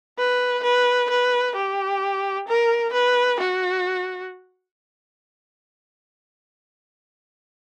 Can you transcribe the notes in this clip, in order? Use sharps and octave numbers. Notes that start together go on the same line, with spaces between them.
B4
B4
B4
G4
A#4
B4
F#4